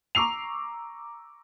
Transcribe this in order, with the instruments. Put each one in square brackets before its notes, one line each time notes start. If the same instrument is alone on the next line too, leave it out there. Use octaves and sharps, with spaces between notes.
[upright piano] A#5 C#6 D6 E6 C7 F7